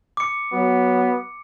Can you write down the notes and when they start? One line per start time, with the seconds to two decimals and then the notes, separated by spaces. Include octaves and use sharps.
0.17 D6 C#7
0.52 F#3 B3